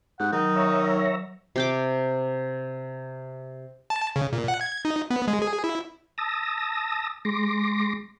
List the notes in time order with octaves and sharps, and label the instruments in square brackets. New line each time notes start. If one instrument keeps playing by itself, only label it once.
[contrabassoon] G#2 [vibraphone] G4 [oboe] F#5
[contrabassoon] D#3 [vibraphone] F#3 [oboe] D#4
[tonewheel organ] C#5 E5 A#5
[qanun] C3 G5 D6
[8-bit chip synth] A5
C#3
A#2
F#5
G#6
D#4
B3
G#3
G#4
E4
[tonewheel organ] A5 D#6 E6 A#6
G#3 C6 D6 A#6